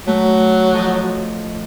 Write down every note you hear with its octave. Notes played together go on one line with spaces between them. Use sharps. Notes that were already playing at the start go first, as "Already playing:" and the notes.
F#3 A3
F3 A4 D#5